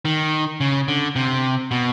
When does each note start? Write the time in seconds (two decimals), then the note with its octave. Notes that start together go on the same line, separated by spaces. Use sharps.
0.05 D#3
0.61 C#3
0.88 D3
1.16 C3
1.71 B2